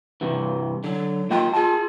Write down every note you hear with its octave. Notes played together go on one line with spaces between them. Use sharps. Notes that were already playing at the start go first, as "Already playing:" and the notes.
G2 C3 E3
D3 F#3
A#3 F4 D#5 G5
F4 G#4 A5